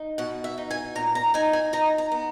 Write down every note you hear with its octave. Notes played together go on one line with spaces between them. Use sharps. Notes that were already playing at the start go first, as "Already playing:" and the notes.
Already playing: D#4
B2 F#5
E5
D#4
G#5
A#2 A#5
A#5
D#4 G#5
G#5
D#4 A#5
A#5
B3